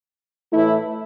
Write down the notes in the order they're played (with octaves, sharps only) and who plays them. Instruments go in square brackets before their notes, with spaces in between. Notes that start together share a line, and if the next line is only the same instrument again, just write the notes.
[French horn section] A2 E3 A3 E4